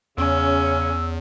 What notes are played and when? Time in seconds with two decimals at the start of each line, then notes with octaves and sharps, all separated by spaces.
0.18 E2 C#3 C#4 E6